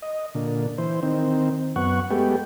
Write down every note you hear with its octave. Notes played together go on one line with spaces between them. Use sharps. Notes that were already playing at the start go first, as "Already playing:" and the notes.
D#5
A#2 D3
E3 C5
D#3 C4
F#2 B3 F#5 C#6
G#3 A3 B3 G4